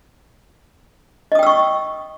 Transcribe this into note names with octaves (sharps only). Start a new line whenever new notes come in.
D#5 G5 C#6 D#6 E6